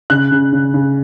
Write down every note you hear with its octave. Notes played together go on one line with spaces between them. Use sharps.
C#3 F#6
C#3
C#3
C#3